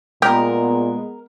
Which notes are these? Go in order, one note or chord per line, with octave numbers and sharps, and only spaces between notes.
A#2 G#3 B3 G4 A#4